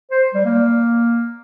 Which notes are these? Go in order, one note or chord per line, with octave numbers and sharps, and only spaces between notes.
C5
G3
A#3